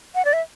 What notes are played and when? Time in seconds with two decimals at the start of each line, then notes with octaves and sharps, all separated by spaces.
0.15 F#5
0.25 D5
0.33 E5